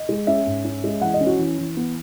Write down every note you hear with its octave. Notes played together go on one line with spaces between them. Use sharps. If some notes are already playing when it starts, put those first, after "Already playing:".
Already playing: D#5
G#3
C#4 E5
G#2
C#4
G#3
E3 F#5
D#5
C#4
F#4
E3
E3
B3